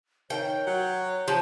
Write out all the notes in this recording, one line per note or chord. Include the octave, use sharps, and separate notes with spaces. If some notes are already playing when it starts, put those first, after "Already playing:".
D#3 C#5 G5
F#3
F3